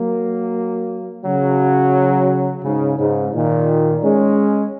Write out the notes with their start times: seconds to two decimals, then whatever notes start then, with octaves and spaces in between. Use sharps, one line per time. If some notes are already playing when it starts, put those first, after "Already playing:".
Already playing: F#3 A#3
1.25 C#3 F#3
2.63 G#2 C#3
2.98 G#2 C#3
3.34 A#2 D#3
4.03 G#3 C#4